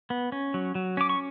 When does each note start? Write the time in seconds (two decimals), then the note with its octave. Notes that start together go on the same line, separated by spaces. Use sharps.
0.10 B3
0.32 C#4
0.54 F#3
0.75 F#3
0.97 C#4 D6
1.09 C#6